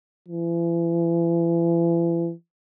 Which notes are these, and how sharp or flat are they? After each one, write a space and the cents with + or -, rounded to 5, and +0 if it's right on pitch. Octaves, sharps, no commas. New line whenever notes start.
E3 +40